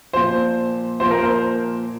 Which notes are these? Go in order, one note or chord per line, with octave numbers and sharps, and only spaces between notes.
A#2 F3 C5
A#2 F3 C5
A#4
C5